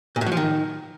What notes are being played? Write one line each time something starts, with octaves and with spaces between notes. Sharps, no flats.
A#2
A2
F#3
F3
D#3